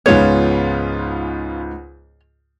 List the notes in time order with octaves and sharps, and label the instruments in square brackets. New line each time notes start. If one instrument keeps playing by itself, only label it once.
[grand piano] C#2 G#2 G#3 [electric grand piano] B3 C#4 F4 [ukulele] C#5